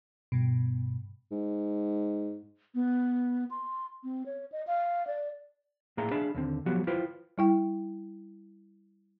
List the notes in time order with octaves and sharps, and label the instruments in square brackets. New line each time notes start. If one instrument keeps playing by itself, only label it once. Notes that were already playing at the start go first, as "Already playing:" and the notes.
[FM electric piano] G2 B2
[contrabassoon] G#2
[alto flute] B3
C6
C4
C#5
D#5
F5
D5
[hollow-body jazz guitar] A2 A#3 G#4 E5 A#5 C6
D4 G#4 E5 F5 A5 B5
D#2 D3 C4
F3 F#3 B3 F#4 G4
E4 F4 B4 C5 G5 C6
[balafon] G3 E4 G5